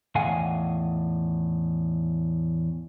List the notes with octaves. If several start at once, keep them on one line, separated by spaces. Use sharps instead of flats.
E2 A2 D#3 F5 F#5 G#5